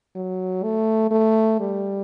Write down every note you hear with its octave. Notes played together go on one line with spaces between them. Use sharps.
F#3
A3
A3
G3